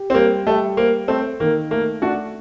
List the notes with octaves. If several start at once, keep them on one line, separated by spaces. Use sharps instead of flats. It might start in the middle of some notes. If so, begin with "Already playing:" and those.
Already playing: G4
C4
G3 A#3
G3 A3
A#3 C5
A3 C4 A4
D#3 A#3
A3 A#3
A3 D4 F#4